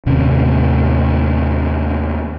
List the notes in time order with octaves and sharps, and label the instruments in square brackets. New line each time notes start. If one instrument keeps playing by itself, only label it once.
[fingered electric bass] D#2 A2 C3 C#4